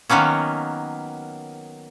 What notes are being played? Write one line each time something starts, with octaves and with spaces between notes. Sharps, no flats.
D#3 F#3 A#3 B3 C#4